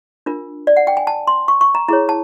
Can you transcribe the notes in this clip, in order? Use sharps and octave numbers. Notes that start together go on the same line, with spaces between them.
D4 F4 A#4
D5
F#5
G5
G#5
A5
C6
C#6
C#6
A#5
E4 G#4 C#5 A#5
A5